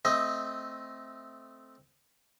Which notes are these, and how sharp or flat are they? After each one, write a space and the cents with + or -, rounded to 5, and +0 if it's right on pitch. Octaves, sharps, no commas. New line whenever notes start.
A3 +0 C4 +0 D#5 +10